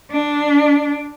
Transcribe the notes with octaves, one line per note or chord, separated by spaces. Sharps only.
D4